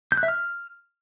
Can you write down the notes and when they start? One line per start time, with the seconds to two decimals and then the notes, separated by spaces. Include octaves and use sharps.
0.12 G6
0.17 F#6
0.23 E5
0.28 F6